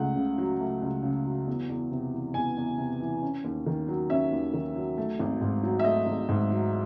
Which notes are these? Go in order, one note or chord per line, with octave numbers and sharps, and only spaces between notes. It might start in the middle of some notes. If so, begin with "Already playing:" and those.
Already playing: C#2 A3 F#5
C#3
F#3
A3
C#2
C#3
F#3
E2
E2
C3
E3
E2 G#5
E2
C3
E3
C#4
D#2
D#3
F#3
C#4 E5
D#2
D#3
F#3
A3
G#1
G#2
F#3
E5
A3 D#5
G#1
G#2
F#3